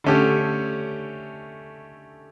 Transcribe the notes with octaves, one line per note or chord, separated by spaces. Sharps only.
D3 A3 C#4 G4